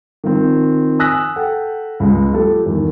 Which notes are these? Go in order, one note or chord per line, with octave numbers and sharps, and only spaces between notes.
D#3 F3 C4
G#5 D#6 E6 F#6 A#6 B6
A4 F#5 G5
C#2 G#3
F3 A3 G4 A4
E2 D#3